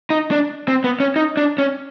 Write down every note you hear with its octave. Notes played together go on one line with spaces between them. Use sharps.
D#4
D4
C4
B3
C#4
D#4
D4
C#4